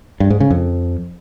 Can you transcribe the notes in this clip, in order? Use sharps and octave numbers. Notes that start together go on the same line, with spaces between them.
G2
G#2
C#3
F2